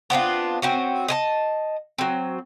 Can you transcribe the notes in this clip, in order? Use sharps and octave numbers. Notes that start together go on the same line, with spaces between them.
B3 C4 D4 F4
C4 C#4 F#4
D#5 G#5 A5
F#3 C4